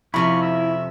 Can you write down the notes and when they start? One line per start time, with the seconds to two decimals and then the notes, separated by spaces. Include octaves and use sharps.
0.14 F2 C3 C#4 E4 B5 C#6
0.42 E5